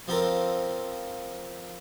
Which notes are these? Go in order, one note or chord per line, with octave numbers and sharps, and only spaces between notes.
F3 C4 F4 A4 A#4